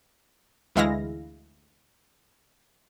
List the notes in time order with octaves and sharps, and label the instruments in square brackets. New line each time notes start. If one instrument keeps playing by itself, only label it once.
[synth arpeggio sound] D2 E3 G#3 E4 F5 A#6